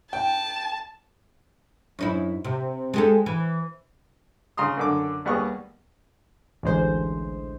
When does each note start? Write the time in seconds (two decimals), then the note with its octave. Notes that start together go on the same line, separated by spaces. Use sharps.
0.13 G5 A5
1.99 F#2 D#4 E4
2.45 C3
2.94 G#3 G4 A4
3.26 E3
4.57 C#3 A#5 C6 D#6
4.77 F#2 D3 D6
5.25 D#2 G3 B3 G#4 F#5 C#6
6.63 A1 D2 G#3 C5